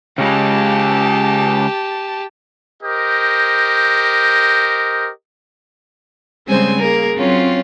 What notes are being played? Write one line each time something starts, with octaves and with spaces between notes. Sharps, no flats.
C#3 G#3 G4 A5
G4 A#4 C5 D#5
C#3 G3 G#3 C4 C5 G#5
A#3 G#4 A#4
F#3 C4 C#4 F4